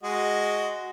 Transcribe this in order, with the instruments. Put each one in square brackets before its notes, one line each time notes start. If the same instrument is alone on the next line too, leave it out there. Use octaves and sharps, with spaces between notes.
[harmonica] G#3 F#4 D#5